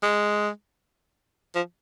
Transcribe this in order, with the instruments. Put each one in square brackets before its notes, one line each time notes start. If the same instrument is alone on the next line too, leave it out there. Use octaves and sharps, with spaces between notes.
[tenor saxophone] G#3
F3